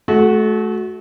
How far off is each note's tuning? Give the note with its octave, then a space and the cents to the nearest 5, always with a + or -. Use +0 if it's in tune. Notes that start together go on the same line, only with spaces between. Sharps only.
A3 -30 F#4 +0